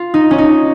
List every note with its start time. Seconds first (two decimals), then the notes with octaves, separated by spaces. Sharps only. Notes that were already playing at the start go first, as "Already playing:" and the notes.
Already playing: F4
0.14 D#4
0.31 C#4
0.38 D#4